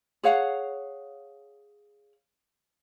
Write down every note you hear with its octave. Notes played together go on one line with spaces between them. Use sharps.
G#4 C#5 F5 F#5